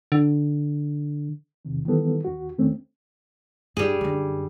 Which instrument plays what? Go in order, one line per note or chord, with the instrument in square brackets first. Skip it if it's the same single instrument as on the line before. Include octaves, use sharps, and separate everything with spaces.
[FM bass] D3
[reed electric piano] E2 C3 D#3
D#3 E3 G3 B3 A4
D#2 F#4
E2 D#3 A3 C4 C#4
[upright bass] G2 [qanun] G3 G#4
[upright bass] F#2 D3